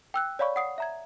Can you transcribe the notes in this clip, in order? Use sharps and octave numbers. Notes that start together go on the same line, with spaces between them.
G5 E6 F#6
C#5 D5 F5 B5 C#6
F#5 D#6 C7
E5 A#5 G#6